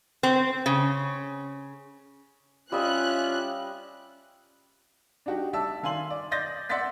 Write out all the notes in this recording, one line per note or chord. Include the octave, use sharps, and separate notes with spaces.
C4
C#3
G3 C#4 F4 D#5 E5 F#6
D4 D#4 F#4 G4
D5 E5 A5 E6
D#3 F5 G#5 C6 F#7
D5
D5 D#5 C6 G6 A6 A#6
D5 E5 F#5 C6 A6 B6